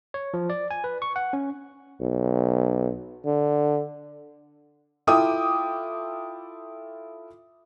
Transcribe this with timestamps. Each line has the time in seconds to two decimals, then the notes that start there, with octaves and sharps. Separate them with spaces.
0.14 C#5
0.34 F3
0.50 D5
0.71 G#5
0.84 B4
1.02 C#6
1.16 F#5
1.33 C#4
2.01 B1
3.25 D3
5.07 E4 F4 A4 G5 D6 D#6